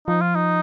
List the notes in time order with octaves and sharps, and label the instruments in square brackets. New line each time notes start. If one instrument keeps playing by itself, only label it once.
[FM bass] F3 [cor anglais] D#4
[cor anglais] F4
D#4